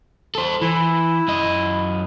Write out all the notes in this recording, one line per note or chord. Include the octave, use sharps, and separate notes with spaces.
A4 C5
E3 E4
F#2 D#5